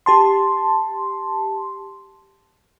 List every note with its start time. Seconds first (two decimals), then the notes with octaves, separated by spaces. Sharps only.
0.06 G4 A5 C6